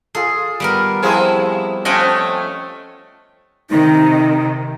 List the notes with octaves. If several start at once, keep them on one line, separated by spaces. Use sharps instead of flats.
F4 G#4 A4
G3 B3 A#4
F3 C4 E4 G4 G#4 A5
F3 A3 C4 C#4 C#5 D#5 F#5 G5
C3 D#3 D#4